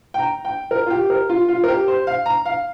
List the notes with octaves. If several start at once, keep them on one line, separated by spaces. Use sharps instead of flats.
G5
A#5
G5
A#4
F4
G4
A#4
F4
F4
A#4
G4
C5
F5
A#5
F5